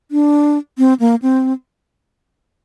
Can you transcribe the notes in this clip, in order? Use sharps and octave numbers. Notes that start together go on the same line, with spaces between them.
D4
C4
A#3
C4